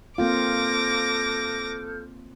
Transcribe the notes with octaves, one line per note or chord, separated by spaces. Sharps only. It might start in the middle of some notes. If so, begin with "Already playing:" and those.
A#3 C4 F4 A4 D6 F6 G6 A#6